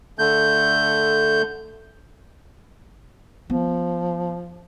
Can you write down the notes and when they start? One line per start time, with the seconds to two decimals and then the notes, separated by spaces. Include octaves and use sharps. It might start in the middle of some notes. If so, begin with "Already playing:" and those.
0.19 D3 A3 G6
3.50 F3 B3